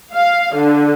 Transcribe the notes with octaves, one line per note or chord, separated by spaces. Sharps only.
F5
D3